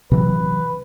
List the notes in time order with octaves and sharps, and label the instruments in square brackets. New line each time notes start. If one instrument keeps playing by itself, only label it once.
[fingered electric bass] C3 E3 F#3 [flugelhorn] B4